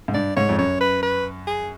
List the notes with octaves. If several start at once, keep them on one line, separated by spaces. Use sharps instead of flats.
G#2
G2 D5
G#2 C#5
F2
F#2 C#5
B4
B4
G#4